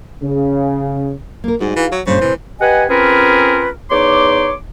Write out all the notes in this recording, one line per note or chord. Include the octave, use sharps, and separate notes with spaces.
C#3
A#3 A#4
G#2 G3 D#4 F#4 G#4
E3 F5
F#3
G2 A#2 C#3 C5
A2 C3 E3
G4 B4 D#5 F#5 G#5
C4 C#4 F4 G#4 A#4 B4
E2 D#4 C#5 C6 D6